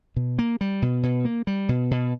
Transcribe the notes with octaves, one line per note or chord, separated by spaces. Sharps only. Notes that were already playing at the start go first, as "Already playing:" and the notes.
B2
A#3
G3
B2
B2
A#3
G3
B2
B2